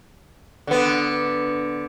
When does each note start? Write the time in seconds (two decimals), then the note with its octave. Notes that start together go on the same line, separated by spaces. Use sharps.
0.67 D3 B3